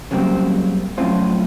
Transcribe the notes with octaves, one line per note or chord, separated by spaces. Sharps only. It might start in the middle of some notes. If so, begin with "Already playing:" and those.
C#3 F#3 G3 A#3 C4
F#2 A2 F3 C4 C#4 F4